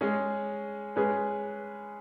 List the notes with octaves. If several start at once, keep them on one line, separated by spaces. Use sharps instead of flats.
G#3 C#4 G#4
G#3 C#4 G#4 B4